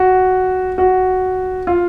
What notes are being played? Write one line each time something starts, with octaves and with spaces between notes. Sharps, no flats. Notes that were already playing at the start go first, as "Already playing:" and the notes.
Already playing: F#4
F#4
F4